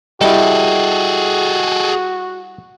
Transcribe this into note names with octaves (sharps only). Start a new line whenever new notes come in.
G3 E4 F#4 G#4 A4 D#5 G5